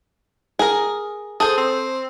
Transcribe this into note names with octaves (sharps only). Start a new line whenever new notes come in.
G#4 A#4
G#4 A4 C5
C4